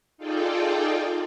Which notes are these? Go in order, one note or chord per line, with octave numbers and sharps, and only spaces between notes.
D#4 F4 G#4 A4 D5 G5